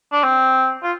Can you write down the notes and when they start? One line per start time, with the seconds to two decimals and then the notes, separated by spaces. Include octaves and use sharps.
0.12 D4
0.24 C4
0.83 F4